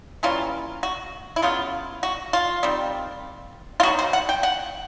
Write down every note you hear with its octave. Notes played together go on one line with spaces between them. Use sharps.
E3 G3 A#3 C#4 F4
F#4
E4
C#3 F#3 B3 F4
F#4
F4
D#3 G3 C4
F4
D#3 F#3 B3 F#4
C5
F#5
G5
F#5